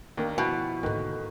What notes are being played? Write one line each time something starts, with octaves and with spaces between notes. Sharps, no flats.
D#2 A#3 D4 A#4
B2 F3 E4 F#4 G5
D#2 G#2 D3 D#3 A4 B4 G5